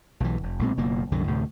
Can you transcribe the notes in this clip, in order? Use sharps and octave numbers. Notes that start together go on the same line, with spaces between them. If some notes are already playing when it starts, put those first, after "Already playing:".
B1 E3
F1
B1 A#2 G#3 C4
F#1 B2 A#3
C2 F#2 D3 D#3
D2 A2 C3